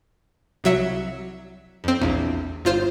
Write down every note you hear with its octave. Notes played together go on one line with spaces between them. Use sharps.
C2 F#3 E5 C#7
F2 C4
A#1 E2
G1 F4 C5